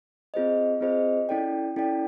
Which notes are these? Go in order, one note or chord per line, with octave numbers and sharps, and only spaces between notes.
C4 F4 G#4 C5 D#5
C4 F4 G#4 C5 D#5
C#4 E4 A4 D5 G5
C#4 E4 A4 D5 G5